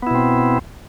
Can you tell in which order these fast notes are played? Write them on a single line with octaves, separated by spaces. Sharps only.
B3 E4 B2 C4